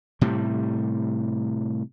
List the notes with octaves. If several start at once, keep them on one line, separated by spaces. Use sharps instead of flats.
A2 C3 G3